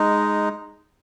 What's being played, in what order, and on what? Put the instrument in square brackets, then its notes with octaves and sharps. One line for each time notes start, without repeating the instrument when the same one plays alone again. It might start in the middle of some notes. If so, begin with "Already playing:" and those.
Already playing: [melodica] G#3 D#4